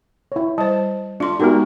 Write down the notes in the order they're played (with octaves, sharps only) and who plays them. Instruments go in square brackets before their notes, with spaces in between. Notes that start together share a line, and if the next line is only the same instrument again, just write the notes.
[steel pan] E4 C#5
[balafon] G3 C5 [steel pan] A5
[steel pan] D4 [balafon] F4 C6
[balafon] G#3 B3 D#4 [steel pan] F#4 G4 A#4